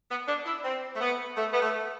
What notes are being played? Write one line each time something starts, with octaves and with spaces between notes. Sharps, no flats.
B3
D4
E4
C4
A3
B3
A3
B3
A3